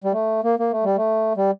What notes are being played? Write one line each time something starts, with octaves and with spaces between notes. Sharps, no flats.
G3
A3
A#3
A#3
A3
G3
A3
G3